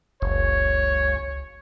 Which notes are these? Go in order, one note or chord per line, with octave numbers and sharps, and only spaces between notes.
F#1 C#2 C#5